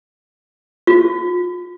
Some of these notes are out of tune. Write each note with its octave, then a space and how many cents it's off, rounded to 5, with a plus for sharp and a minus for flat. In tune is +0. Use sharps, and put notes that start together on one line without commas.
F4 +30